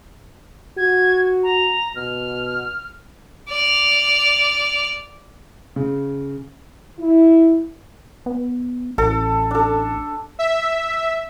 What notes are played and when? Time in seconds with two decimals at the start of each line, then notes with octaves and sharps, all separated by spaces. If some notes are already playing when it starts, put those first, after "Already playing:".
0.78 F#4 G#6
1.43 A#5
1.96 B2 F6
3.49 D5 F6
5.76 C#3
6.99 E4
8.26 B3
8.98 A1 A4
9.51 D4 A4
10.39 E5